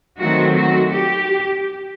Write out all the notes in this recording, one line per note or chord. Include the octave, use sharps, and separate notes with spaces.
D#3 F#3 A3 C4 F#4
F#4
G4